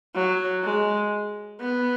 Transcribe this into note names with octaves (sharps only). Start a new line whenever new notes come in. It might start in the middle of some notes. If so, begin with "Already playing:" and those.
F#3
G#3
B3